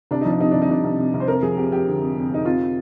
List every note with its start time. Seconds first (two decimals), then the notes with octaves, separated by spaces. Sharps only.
0.11 C2 D4
0.21 F3 D#4
0.30 D4
0.40 C3 D#4
0.51 C2 D4
0.62 D#4
0.69 C2 D4
0.84 C2
0.98 C3
1.14 C2
1.20 C5
1.27 F2 A#4
1.43 F3 G#4
1.57 F2 G4
1.72 F2 G4
1.87 D3
2.01 F2
2.16 F2
2.30 F2 D#4
2.45 F2 F4